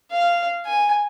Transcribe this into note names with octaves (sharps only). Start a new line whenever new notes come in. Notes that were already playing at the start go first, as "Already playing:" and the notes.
F5
G#5